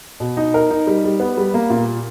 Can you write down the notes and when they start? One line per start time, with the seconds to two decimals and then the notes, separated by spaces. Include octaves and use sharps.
0.20 B2
0.37 D#4
0.54 A#4
0.70 D#4
0.87 G3
1.04 G3
1.20 B3
1.37 G3
1.54 A#3
1.70 A#2